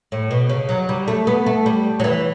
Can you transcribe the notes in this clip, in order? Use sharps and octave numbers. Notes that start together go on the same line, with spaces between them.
A2
B2
C#3
F#3
G3
A3
B3
A3
G3
F#3
E3